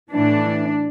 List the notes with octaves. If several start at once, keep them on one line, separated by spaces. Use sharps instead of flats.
A2 E3 D4